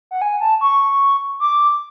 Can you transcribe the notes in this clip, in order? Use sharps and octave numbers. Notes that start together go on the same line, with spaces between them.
F#5
G#5
A5
C#6
D6